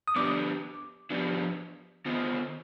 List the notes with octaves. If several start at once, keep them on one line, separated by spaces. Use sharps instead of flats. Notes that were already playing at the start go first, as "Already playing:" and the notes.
D#6
F3 B3 D4 G4 D6
F3 B3 D4 G4
D#3 B3 F4 C5